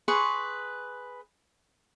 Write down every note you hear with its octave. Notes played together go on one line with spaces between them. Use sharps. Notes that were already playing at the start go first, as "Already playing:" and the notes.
G#4 B4 C6 C#6